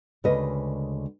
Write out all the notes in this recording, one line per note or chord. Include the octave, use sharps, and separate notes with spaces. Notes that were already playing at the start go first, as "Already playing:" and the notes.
D2 C#3 G#3 A#4 B4 D#5